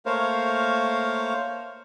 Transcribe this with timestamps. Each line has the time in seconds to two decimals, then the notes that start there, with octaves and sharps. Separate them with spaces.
0.06 A3 A#3 A#4 C5 C#5 F5